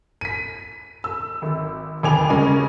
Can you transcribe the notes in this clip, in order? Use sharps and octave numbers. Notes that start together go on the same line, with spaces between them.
B6 D#7
E6
G#1
A1 D#2 G5 G#5 D6 F7
C#3 G3 G#3 A#3 C#4